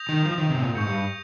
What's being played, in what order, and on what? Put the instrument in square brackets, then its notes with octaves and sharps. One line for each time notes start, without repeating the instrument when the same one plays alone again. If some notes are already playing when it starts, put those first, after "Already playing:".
Already playing: [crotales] D#6 G6 A#6 F7
[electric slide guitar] D#3
F3
D#3
C3
G#2
A#2
[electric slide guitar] G#2 [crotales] C#6 G6 C#7
[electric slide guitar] G2